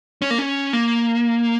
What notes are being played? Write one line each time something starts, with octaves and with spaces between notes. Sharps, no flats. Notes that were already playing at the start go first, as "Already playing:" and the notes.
C#4
A#3
C#4
A#3